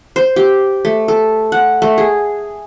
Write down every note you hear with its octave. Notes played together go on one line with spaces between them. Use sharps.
C5
G4
A3
A4
F#5
A3
G#4